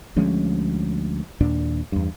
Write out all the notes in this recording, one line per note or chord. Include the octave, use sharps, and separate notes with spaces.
D2 F3 G#3 C#4
D#2 A#2 D4
E2 G2